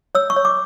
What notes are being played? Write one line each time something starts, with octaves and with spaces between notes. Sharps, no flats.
C#5 E6
C#6
C#5
D6